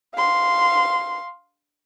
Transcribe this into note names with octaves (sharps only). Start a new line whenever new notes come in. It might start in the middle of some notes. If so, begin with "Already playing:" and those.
F5 C6